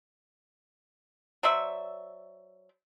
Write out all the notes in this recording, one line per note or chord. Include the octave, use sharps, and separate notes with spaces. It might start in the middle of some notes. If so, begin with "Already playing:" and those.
F#3 C5 D5 E5